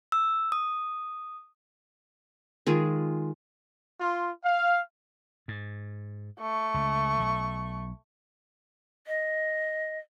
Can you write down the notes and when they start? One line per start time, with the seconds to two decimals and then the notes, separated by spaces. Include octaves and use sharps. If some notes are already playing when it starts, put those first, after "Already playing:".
0.12 E6
0.52 D#6
2.67 D#3 G#3 F4 G#4
3.99 F4 F5 C6
4.45 F5
5.48 G#2
6.40 A3 C#6
6.74 C#2
7.20 B1
9.07 D#5